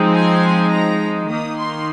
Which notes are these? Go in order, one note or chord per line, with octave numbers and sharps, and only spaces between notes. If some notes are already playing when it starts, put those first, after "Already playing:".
Already playing: F3 G#3 C4 D#4
G#5
A#5
D#3 A#3 D#4 D#6
C6